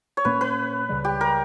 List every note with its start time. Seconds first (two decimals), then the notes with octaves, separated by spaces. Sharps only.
0.17 C#5
0.25 A#2 A#3 C#4 B4
0.41 B4
0.89 C#2 C#3 G3
1.05 G4
1.21 A#4